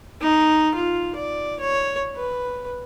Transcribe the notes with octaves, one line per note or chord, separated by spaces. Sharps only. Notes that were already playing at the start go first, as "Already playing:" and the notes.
D#4
F4
D5
C#5
B4